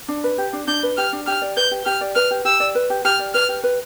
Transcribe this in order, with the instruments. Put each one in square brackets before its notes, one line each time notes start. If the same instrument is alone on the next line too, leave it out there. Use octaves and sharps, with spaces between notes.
[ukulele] D4
B4
G4
D4
[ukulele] D4 [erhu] G6
[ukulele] B4
[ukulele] G4 [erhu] F6
[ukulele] D4
[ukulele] G4 [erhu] F6
[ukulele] D5
[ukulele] B4 [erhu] G6
[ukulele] G4
[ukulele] G4 [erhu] F6
[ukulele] D5
[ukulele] B4 [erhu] F6
[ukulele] G4
[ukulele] G4 [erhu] E6
[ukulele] D5
B4
G4
[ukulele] G4 [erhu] F6
[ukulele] D5
[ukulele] B4 [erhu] F6
[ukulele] G4
B4